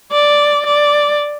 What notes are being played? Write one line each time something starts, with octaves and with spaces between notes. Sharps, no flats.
D5
D5